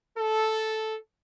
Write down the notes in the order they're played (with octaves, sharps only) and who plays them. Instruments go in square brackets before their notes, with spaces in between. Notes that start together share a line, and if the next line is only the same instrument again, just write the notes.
[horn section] A4